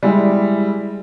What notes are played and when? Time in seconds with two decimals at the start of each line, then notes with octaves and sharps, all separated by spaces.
0.03 G3 G#3 E4